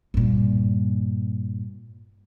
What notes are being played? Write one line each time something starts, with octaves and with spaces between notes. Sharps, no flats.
G2 A#2